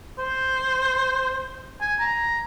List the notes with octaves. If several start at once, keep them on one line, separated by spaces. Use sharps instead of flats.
C5
G#5
A#5